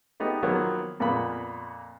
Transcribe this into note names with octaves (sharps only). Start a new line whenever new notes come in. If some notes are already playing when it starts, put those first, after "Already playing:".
A3 B3 D#4 G4
D#3 F3 F#3 A#3 B3
F2 A#2 A#3 B3 B5